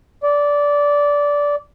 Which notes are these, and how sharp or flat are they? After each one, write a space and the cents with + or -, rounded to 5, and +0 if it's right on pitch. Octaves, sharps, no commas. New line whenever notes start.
D5 -15